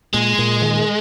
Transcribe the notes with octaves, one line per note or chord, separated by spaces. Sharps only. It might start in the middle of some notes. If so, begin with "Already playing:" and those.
A#2 G#3
A#2
D#3